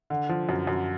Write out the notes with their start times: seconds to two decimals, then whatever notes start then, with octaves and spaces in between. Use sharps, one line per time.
0.10 D3
0.29 F3
0.49 F#2
0.67 F#2